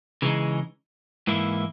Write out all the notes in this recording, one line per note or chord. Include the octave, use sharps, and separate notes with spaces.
C#3 E3 G#3 D#4
G#2 E3 A#3 E4